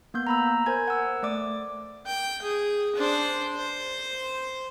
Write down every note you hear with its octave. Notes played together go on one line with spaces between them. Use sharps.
A#3 B3 G6
A#5 B5 E6
A#4 C5 G#5 G#6
F#5 E6
A3 D5 D6
G5
G#4
D4 C5
C5